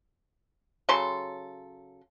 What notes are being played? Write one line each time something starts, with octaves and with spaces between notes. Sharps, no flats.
C#3 F#3 A4 C6